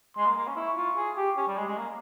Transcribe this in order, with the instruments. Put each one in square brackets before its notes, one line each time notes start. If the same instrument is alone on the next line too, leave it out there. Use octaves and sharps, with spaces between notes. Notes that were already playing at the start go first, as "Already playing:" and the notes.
[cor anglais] G#3 [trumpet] C6
[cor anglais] A#3
A#3
C#4
[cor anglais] E4 [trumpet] C#6
[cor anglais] F4
G#4
G4
C#4
G3
G#3
G#3
A#3